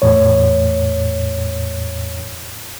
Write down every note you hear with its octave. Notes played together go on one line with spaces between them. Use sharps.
E2 A2 C#5